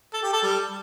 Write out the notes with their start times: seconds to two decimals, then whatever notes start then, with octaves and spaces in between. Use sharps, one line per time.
0.13 A4
0.23 G4
0.33 A4
0.43 G3